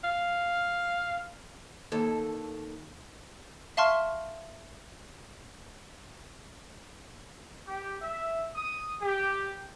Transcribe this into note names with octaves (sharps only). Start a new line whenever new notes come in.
F5
D#2 A4
E5 F5 A5 C6 C#6 F6
G4
E5
D#6
G4